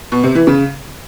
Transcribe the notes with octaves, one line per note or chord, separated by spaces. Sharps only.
B2
C3
E3
C#3